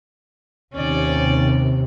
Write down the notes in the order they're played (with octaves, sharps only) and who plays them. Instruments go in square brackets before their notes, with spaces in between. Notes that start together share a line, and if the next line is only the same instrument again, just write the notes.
[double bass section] D#2 C3 [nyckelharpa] C#4 D5